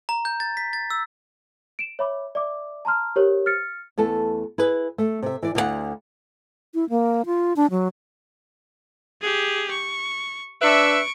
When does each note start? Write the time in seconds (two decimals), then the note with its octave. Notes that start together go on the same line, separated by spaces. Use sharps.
0.09 A#5
0.25 G6
0.40 A6
0.57 B6
0.73 A6
0.90 E6
1.79 D7 E7
1.99 C#5 E5 B5 D6
2.35 D5 E5 D6
2.85 A5 A#5 C6 F6
3.16 G4 A#4 C5 C#5
3.46 F6 A6 C#7
3.98 E2 A3 A4 A5
4.58 E4 G#4 B4
4.98 A3
5.23 C3 E5
5.43 E3 D5
5.55 D2 D3 B3 E4 F5 F#5
6.74 E4
6.90 A#3
7.26 F4
7.56 D4
7.71 F#3
9.22 G4 G#4
9.71 C#6
10.62 D4 B4 E5 C#6 D7